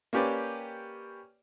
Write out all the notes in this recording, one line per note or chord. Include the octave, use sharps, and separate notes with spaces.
A#3 C#4 G4 B4 D5